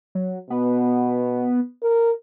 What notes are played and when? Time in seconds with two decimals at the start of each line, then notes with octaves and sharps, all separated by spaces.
0.15 F#3
0.50 B2 B3
1.83 A#4